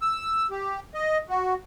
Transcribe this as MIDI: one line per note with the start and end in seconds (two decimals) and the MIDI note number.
0.02 0.47 88
0.51 0.80 67
0.94 1.18 75
1.29 1.54 66